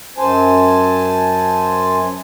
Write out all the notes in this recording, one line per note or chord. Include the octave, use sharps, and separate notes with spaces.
F#2 C5 G#5 A5